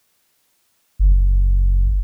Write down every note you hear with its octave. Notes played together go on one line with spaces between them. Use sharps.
F#1